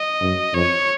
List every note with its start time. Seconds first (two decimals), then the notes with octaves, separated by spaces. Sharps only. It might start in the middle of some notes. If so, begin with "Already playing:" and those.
Already playing: D#5
0.21 F#2
0.54 F2 C#5